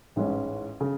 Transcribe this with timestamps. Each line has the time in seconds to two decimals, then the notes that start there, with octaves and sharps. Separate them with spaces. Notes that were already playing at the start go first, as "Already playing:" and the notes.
0.16 A1 G#2 E3 G#3 C#4
0.81 C#3